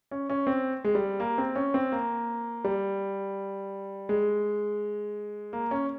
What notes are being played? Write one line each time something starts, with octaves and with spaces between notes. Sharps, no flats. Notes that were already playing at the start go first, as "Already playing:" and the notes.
C#4
C#4
C4
G#3
G3
A#3
C4
C#4
C4
A#3
G3
G#3
A#3
C#4